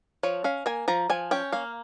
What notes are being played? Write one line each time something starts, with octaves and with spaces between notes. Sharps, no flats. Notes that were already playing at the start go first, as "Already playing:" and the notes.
F3 C#5
C#4 F5
A#3 G#5
F3 A#5
F3 G#5
C#4 G5
A#3 F5